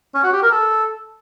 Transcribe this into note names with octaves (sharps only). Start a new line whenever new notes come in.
C#4
F#4
G4
A#4
A4